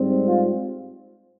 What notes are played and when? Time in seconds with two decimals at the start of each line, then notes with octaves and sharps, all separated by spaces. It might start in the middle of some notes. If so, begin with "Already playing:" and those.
Already playing: G#2 G3 C4
0.24 F4